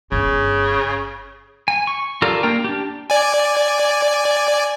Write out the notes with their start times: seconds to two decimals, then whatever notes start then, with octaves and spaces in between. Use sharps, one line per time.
0.12 G1 C#3 D4
1.68 G#5
1.87 C#6
2.22 F4 G4 A4 A#4 D5
2.43 A#3 D4 A#4 G5
2.64 D4 G4
3.10 D5 G#5